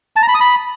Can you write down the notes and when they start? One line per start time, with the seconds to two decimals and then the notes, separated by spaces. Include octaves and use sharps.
0.16 A5
0.22 A#5
0.28 B5
0.34 D#6
0.40 B5